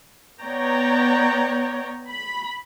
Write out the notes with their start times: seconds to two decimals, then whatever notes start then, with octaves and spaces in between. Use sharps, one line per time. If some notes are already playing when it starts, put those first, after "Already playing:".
0.41 B3 C#5 D5 G5 A#5
2.10 B5